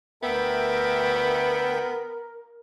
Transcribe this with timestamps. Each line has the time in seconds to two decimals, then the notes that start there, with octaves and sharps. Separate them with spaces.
0.23 D2 B3 A#4 E5 G5